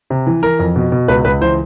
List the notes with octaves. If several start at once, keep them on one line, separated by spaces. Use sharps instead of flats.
C3
E3
E3 A#4
F2
B2
B2
C#2 B4
C#2 B4
E3 C5